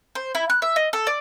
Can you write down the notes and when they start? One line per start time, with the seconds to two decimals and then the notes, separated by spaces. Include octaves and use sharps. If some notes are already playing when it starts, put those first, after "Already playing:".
0.15 C5
0.35 E4
0.50 F#6
0.62 E5
0.76 D#5
0.93 A4
1.07 D5